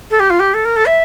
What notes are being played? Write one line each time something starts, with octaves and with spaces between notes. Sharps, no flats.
A4
G4
F4
G4
A4
A#4
A4
E5